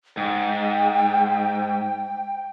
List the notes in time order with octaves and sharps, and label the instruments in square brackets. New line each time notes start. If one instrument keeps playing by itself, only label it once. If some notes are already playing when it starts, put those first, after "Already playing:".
[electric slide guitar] G#2 [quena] G5